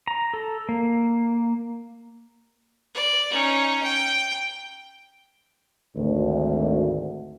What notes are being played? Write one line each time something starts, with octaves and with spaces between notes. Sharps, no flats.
A#5
A4
A#3
D5
C#4 D#4
G5
G#1 D2